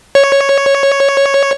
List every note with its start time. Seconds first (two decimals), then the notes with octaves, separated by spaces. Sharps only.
0.15 C#5